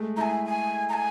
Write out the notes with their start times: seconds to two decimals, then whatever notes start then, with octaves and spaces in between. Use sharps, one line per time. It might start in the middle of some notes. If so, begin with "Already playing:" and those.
Already playing: G#3 A3
0.17 E4 G#5 A#5
0.45 G#5
0.89 A#5
0.94 G#5